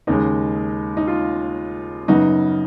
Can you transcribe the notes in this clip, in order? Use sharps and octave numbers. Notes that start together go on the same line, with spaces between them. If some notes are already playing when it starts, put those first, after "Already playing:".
D#2 C#3 G#3 D#4
D#4
F4
F#2 C#3 F#3 B3 D#4 F#4